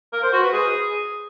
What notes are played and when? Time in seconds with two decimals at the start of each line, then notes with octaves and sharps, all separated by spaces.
0.13 A#4
0.23 C5
0.33 F#4
0.43 B4
0.53 G#4